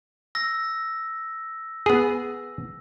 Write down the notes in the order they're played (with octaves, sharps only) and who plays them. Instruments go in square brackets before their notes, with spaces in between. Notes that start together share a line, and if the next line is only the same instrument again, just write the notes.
[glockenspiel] E6 A#6
[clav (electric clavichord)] B3 G#4